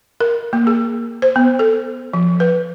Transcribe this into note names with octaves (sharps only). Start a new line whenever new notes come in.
A#4
A#3
G#4
C5
B3
A4
F3
B4